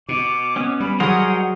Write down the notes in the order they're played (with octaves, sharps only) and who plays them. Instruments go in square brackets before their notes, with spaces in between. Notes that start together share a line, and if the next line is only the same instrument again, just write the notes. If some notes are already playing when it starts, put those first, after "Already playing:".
[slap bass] B2 [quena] D6
[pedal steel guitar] B3 C#4
[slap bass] G3 [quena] B5
[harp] F#3 G#4 D#6 [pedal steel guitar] A#4 C5 D#5 [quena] F#5